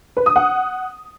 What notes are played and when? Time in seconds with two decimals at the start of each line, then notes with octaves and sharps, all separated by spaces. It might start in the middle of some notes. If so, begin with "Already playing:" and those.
0.17 B4
0.26 D#6
0.36 F#5